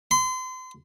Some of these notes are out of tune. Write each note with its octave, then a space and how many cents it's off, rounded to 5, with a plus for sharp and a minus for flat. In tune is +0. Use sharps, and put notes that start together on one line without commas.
C6 -35